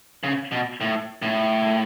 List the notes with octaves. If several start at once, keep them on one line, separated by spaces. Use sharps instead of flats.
C#3
B2
A2
A2